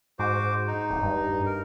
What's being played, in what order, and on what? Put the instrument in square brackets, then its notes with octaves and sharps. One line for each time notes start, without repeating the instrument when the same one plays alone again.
[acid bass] G#2 [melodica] F#4 C5 D6
[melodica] D#4
[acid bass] D1
G2
[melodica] A#4